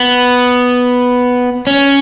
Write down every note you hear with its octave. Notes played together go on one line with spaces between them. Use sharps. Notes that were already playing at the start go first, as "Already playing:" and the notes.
Already playing: B3
C#4